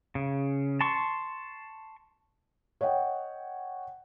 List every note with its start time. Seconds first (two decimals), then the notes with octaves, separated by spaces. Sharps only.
0.15 C#3
0.81 A5 C6 C#6
2.81 C#5 D#5 F#5 G5